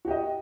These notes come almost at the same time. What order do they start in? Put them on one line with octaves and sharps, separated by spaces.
F#4 G4 D#5